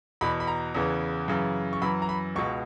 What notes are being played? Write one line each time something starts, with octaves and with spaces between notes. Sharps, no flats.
E2 B2 B5
B5
A#5
E2 C#3 E3
F#2 C#3 E3
C#6
F#2 E3 B5
A#5
B5
C#2 B2 C#6